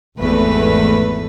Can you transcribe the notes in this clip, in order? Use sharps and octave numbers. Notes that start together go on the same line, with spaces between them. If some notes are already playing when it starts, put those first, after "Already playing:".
G#1 E2 A3 B4